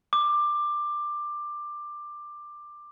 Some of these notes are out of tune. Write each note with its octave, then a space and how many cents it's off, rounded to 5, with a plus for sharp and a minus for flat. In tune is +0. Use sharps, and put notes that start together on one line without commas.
D6 +15